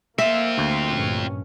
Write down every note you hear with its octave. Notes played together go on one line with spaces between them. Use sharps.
A#3 C4 F4 E5
D2
A#1 G2 C#4